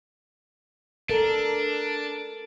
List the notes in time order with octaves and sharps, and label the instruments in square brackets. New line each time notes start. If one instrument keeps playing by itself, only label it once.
[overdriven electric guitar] D4 [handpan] A4 A#4